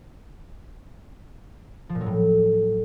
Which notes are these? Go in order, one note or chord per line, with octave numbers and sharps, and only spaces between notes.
F3
A#2
F#3
A2